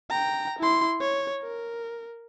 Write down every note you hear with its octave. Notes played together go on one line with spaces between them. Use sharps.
G5 A#5
E4 C6
C#5
A#4